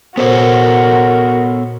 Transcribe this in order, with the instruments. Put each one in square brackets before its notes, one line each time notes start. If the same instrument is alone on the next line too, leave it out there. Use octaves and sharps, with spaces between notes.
[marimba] A#2 C5 [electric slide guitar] B3 A4 C#5 [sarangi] F#4 [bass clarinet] A#4